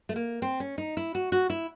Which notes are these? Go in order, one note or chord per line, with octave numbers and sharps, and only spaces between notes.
A3
A#3
C4
C#4
D#4
E4
F#4
F#4
E4